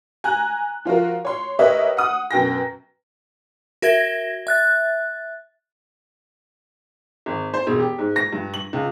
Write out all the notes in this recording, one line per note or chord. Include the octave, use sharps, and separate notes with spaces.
G#5 A#5 F#6
F3 F4 F#4 A#4
C#5 C6
G4 A#4 B4 C#5 D#5 E5
F#5 D#6
F#2 B2 G5 A#6
F#4 A#4 E5 G#6 A#6 G7
E5 F#6 A6
G#1
C5
E1
G4
G#2
A#6
G2
F#7
C#2